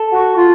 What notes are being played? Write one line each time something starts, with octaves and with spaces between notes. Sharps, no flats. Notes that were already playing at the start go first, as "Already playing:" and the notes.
Already playing: A4
F#4
F4